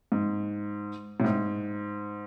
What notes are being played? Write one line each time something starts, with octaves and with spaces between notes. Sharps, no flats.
G#2
A2
G#2